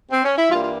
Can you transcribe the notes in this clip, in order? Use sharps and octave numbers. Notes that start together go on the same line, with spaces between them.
C4
C#4
E4
G2 E3 G3 A#3 F4
F4